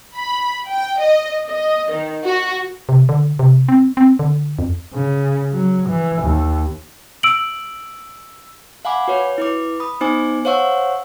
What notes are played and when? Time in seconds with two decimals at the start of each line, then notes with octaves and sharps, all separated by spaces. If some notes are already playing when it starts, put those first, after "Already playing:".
0.18 B5
0.69 G5
1.01 D#5
1.48 D#5
1.91 D#3
2.25 F#4
2.89 C3
3.09 D3
3.39 C3
3.69 C4
3.97 C4
4.19 D3
4.59 F2
4.94 C#3
5.53 F#3
5.89 E3
6.22 D#2
7.23 E6 D7 F#7
8.85 F5 F#5 G#5 B5 D6
9.08 F#4 B4 C#5
9.38 E4 B4 D6
9.80 B5 D#6
10.01 B3 D#4 C5 G#5 D6
10.45 C5 C#5 F5 F#5 C#6 E6